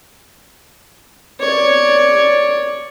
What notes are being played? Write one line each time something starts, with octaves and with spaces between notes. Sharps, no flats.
C#5 D5